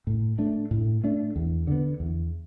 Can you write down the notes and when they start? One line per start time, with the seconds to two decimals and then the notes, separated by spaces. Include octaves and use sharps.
0.07 A2
0.39 A3 D4
0.71 A2
1.04 A3 D4
1.36 E2
1.67 D3 B3
2.00 E2